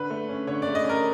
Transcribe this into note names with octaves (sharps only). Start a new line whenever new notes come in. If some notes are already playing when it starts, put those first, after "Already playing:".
Already playing: D3 B4
A3
C#4
D3 C#5
A3 D5
D#5
C#4 A#4